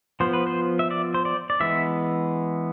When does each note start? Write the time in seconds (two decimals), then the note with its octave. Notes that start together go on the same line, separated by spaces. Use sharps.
0.20 F3 B3 C5
0.33 B4
0.47 C5
0.79 E5
0.91 D5
1.14 C5
1.25 D5
1.50 D5
1.60 E3 G#3 B3 E5